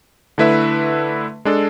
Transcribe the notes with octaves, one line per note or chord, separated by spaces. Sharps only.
D3 A3 E4 B4 E5
G#3 D4 A4